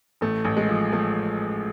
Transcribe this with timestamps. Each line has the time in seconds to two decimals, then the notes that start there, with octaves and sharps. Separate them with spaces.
0.21 A1 A3
0.45 A1
0.57 G#3
0.69 F3
0.92 F3 A3